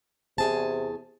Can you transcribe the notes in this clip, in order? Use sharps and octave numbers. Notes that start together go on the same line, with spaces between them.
E2 C3 G#4 A5